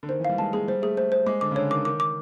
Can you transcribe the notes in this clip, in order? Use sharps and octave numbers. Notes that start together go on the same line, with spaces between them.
D3
D#3 C5
E3
G3 F5
G#3 A5
G#3 G#4
G3 C5
A3 G#4
A3 C5
C5
G#3 D6
D3 D6
C#3
D3 C#5
D#3 D6
D#3 D6
D6